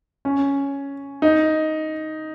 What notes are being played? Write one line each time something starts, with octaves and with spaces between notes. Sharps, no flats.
C#4
D#4